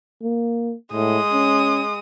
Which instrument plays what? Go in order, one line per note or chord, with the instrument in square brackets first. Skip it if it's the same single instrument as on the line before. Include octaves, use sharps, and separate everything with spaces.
[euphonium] A#3
[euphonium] A2 [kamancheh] G#3 D#6
[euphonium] C#4